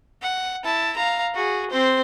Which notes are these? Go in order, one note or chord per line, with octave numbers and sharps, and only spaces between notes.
F#5
E4 A5
F5 A#5
F#4 G#4
C4 C5